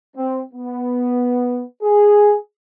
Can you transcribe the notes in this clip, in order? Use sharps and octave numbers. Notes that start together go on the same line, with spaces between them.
C4
B3
G#4